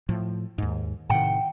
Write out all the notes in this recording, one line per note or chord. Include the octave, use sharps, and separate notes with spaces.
A2 F3
D#2 G#2
A2 C3 D#3 F#5 G5